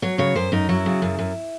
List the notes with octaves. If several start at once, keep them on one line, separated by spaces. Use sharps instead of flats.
F#3 C#5
C#3 C#5
F#2 C5
F#2 D#4
F#3 E4
C#3
F#2
F#2